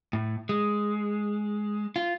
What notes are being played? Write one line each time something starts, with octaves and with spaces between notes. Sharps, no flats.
A2
G#3
F4